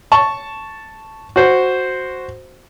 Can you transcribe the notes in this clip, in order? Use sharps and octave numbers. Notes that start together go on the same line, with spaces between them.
A5 C#6
F#4 C5